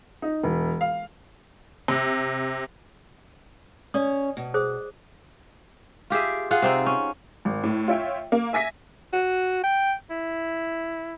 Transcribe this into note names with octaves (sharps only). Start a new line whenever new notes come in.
D#4
E1
F5
C3
C#4 C#5 D5 D#6
B2
G#4 C5 D#6
F4 G4 G#4 E5
F4 G#4 F#5
C3 C4 D#4
C#4
G#1
A2
F4 C#5 E5 G5
A#3
E5 G#5 A#6 B6
F#4
G5
E4